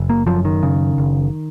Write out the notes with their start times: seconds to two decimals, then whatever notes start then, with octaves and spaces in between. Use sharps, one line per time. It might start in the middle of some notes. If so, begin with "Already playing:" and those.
Already playing: F#1
0.09 A#3
0.27 F#2 F3
0.45 D#3
0.63 C#3
0.98 F#1